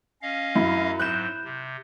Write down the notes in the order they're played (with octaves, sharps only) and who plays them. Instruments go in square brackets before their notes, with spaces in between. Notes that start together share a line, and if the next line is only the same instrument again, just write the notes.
[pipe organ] C#4 D#5 F5
[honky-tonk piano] F#2 [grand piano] E4
[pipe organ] G#2 F#3 [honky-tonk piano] F#6 G6 E7
[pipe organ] C3